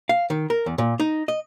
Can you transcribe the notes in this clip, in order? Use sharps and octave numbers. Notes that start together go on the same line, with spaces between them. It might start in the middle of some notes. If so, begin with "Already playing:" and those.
F5
D#3
A#4
E2
A#2
D#4
D#5